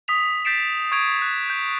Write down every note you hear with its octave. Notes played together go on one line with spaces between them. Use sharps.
D#6 B6 F7
G6 A6 B6 C7 D7 E7
C#6 G6 G#6 D7 F7
C#6
F#6
G6